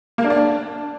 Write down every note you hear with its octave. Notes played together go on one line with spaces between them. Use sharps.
A#3
D4
D5
D4